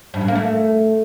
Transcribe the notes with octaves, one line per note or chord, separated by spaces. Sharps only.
G2
F#2
A#3
A3